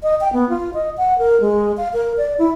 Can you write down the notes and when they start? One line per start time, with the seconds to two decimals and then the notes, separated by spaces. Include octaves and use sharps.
0.03 D#5
0.21 G5
0.33 B3
0.49 F4
0.74 D#5
0.97 F#5
1.18 A#4
1.41 G#3
1.77 F5
1.93 A#4
2.17 D5
2.39 E4